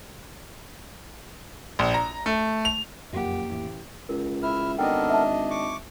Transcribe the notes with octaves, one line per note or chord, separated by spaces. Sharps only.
A#1
A#5
A3
F7
F#1 F2 A#2 A#3 G4 F#5
A1
C#2 A#4
E4 E5 F6
G#1 B3 D4 A4 A#4 D#5 G5
E5 A5
C#6 D6